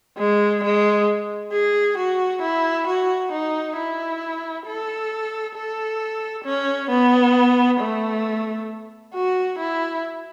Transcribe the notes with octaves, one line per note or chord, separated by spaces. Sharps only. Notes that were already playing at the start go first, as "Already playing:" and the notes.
G#3
G#3
G#4
F#4
E4
F#4
D#4
E4
A4
A4
C#4
B3
A3
F#4
E4